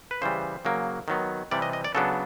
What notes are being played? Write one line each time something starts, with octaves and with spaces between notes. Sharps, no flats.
B4
C#3 E3 G3 C5
C#3 F#3 A#3
D#3 F#3 B3
C3 E3 G3 D5
D#5
D#5
D5
C#3 F#3 B3 D4 A4